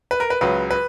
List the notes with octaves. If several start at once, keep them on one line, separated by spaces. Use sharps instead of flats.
B4
A#4
B4
C#2 C#3 F#3 B4
B4